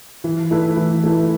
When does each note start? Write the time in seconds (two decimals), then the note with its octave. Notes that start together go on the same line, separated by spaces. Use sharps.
0.24 E3
0.51 A3 E4 B4
0.77 E3
1.04 A3 E4 B4